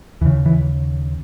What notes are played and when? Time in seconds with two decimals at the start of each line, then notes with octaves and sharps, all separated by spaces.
0.21 D#2 E3
0.25 C#3
0.46 E3